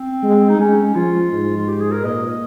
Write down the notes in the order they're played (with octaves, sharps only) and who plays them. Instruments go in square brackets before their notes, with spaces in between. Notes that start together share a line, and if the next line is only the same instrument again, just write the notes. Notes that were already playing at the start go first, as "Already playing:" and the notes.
Already playing: [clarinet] C4
[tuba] G#3
[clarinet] D#4
[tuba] G#3 [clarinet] C#4
[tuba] F3 [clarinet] F4
[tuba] G#2
[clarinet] F4
G4
G#4
A#4
[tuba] A#2 [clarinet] D#5